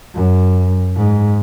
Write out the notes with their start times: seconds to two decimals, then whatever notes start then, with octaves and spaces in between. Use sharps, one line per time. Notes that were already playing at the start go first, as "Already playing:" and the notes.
0.15 F#2
0.96 G#2